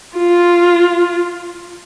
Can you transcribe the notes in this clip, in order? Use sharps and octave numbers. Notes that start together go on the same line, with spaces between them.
F4